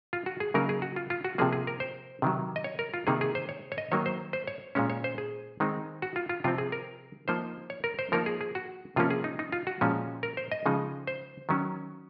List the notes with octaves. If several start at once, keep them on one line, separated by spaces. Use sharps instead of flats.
F4
F#4
G#4
C#3 F#3 A#3 D#4 A#4
G#4
F#4
F4
F4
F#4
C3 F3 A#3 G#4
G#4
A#4
C5
C3 D#3 F#3
D#5
C#5
A#4
F4
C3 D#3 A#3 D#4 G#4
G#4
C5
C#5
C#5
D#5
D#3 F#3 A#3 C#5
C5
C5
C#5
A#2 G#3 C#4 C#5
C#5
C5
G#4
D#3 G#3 C4 D#4
F#4
F4
F4
C3 F3 C4 F4
G#4
A#4
F3 A#3 D#4 C5
C#5
A#4
C5
F3 A#3 D#4 A#4
G#4
G#4
F#4
C3 F3 A#3 C#4 F4
G#4
D#4
D#4
F4
F#4
A#2 F3 G#3 C#4
A#4
C5
D#5
C#3 F3 G#3 D#4
C5
D#3 F#3 C#4